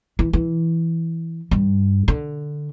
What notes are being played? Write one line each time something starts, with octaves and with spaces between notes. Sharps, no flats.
E3
E3
G2
D3